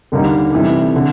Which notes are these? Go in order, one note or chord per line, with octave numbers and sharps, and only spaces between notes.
D#2 D3 G3 A#3 D#4
F2 C3 E3 G3
D3